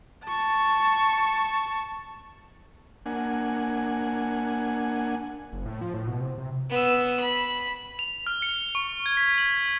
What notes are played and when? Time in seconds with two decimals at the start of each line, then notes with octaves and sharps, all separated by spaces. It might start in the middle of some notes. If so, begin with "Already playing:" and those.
0.24 A5 C#6
3.06 A#3 D4 F#5 G#5
5.53 F#1
5.66 A2
5.81 F3
5.94 A2
6.07 B2
6.21 C3
6.38 C3
6.70 B3 E6
7.20 B5
7.99 F7
8.27 F6
8.42 C#7
8.75 C#6
9.06 G#6
9.17 B6
9.38 F#7